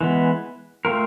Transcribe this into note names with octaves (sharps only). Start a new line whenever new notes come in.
E3 G#3 B3
A3 C4 F4 A#4